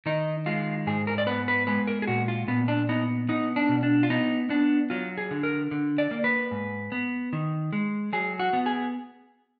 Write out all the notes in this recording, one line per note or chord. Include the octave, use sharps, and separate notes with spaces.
D#3 D#4
G#3 F4
G#2 G#4
A#4
D5
B3 B4
B4
G#3 B4
A#4
G#4
A#2 F#4
F4
A#2 B3
D4
B3 D#4
B3 D#4
D4
B2
D4
F4
B3 D#4
B3 D4
F#3 F4
G#4
D3
A#4
D3
D5
A#3
B4
G#2
B3
D#3
G#3
F#3 G#4
F#4
B3
G#4